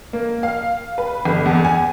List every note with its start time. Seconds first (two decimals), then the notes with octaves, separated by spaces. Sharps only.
0.13 A#3
0.43 F5
0.98 B4
1.25 G1
1.46 E2
1.65 G#5